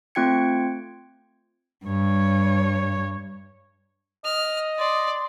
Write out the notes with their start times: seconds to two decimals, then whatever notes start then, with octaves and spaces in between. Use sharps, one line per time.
0.15 A3 C4 F4 G5 G#6 C#7
1.85 G2 C#5
4.25 D#5 F6
4.78 D5 C6